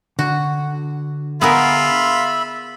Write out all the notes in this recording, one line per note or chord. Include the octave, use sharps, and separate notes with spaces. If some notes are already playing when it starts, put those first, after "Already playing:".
D3 F#4
B3 F4 G#4 A#4 E5 B5